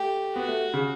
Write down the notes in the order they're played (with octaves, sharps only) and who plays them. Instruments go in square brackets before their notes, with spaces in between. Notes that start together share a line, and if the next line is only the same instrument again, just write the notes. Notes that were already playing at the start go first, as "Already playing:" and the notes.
Already playing: [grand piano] A3 [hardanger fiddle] G4
[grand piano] B3 [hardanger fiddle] F#4
[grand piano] A3
C#3